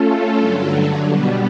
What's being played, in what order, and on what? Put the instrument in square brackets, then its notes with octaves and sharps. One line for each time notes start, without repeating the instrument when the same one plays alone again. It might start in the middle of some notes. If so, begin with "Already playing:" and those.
Already playing: [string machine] A3 C#4 F4 A4
G2 D3 F#3
B2 G3 B3